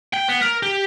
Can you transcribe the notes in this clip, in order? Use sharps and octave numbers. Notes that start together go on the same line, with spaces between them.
G5
B3
A#4
G4